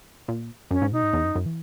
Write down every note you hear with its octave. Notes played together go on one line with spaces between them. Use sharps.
A#2
F#2 C#4
G#2
B2 D#4
G#2
E2
F#2
F#2
E3